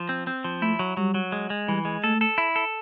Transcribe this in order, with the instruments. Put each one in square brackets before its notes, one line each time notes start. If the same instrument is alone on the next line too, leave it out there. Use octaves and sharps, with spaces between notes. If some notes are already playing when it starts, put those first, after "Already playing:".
Already playing: [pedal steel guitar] F3
C4
C4
F3
[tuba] A3 [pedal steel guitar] E4
[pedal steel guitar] F#3
[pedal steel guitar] F#3 [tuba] G3
[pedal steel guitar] F#3
G#3
G#3
[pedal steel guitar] E3 [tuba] G3
[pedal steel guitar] G#3
[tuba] A3 [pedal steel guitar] A4
[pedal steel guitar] A4
E4
A4